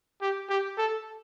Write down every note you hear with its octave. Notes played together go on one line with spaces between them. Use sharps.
G4
G4
A4